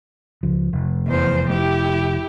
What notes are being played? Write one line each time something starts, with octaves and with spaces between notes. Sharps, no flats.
C#2 F3
F1
E2 C5
E4 G4